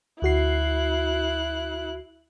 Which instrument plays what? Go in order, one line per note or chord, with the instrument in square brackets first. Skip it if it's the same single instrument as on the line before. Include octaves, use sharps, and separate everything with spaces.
[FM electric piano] D2 F#4 C7 [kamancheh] E4 F#6